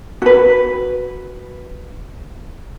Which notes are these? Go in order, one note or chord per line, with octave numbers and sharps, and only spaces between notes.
F#4 B4